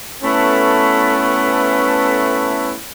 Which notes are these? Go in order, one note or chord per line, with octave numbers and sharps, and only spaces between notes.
A3 B3 C#4 E4 A4 B4